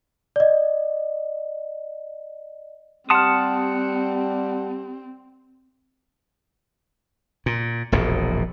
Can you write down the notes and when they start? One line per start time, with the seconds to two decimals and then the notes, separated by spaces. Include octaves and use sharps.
0.36 D5 D#5
3.10 G3 C4 F#5 A5 C6 D#6 F6
7.46 A#2
7.92 E1 A#1 F2 A#2